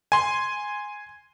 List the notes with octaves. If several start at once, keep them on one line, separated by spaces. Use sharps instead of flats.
G#5 C6